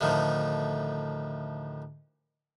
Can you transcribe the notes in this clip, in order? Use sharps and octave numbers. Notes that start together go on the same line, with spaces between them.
D2 A2 D#3 F3